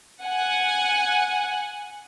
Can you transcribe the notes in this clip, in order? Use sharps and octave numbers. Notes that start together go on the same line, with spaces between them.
F#5 G#5